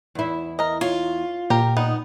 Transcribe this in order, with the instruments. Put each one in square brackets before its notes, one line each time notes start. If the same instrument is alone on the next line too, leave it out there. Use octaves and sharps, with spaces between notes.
[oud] E2 E4
[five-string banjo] A#4 D#5
[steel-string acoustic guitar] F4 [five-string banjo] C#5
[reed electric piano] A#2 [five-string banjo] G4 A#4
[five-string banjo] B3 [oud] D#4